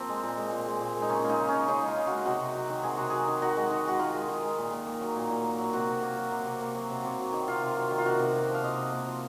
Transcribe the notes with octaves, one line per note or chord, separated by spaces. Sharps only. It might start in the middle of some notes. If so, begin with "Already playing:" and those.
Already playing: F3 A#3 C4
G#3
A#2
G#3
A#2
G#3
A#2
G#3
D#4
C#3 C#4
G#3 F4
D#4
C#3
C#4
G#3
C#3 D#4
G#3
F4
C#3
G#3 F#4
C3 F#4
C3
F#3
D#3
C3 G#4
C3 F#4
F#3 G#4
D#3
D#3 F#4
G#3
D#3
G#3 F#4
D#3 F4
G#3
D#3
G#3
A#2
A#2
A#3
F#3
A#2
A#2
A#3
F#3
C3 F#4
C3
A#3
F#3
C3
C3
A#3
F#3
C3
C3
F#3
D#3
C3 F4
C3
F#3
D#3
F4
C3 F#4
C3
A#3
F3
F5
C3 D#5
C3
A#3
F3